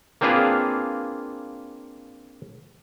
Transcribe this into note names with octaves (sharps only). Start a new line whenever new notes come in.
A#3 C4 D4 F4 G#4 B4